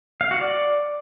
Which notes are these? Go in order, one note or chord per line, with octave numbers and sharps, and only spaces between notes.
F5
F#4
D5